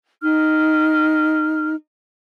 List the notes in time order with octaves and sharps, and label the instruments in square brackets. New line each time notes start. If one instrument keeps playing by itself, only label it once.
[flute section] D#4 F6